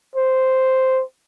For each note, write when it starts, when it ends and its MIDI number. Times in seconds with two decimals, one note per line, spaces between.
0.16 1.02 72